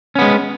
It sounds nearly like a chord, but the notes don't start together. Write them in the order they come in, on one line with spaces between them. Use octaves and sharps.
C#4 B3 G#3